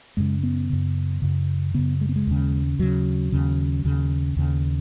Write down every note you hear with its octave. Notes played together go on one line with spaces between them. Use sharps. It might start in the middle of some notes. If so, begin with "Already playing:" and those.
F#2 C#3 G#3
B3
F#2 C#3
F#2 C#3
F#2 C#3 B3
G#3
B3
G#3
D#2 C#3
D#2 C#3 F#3
D#2 C#3
D#2 C#3
D#2 C#3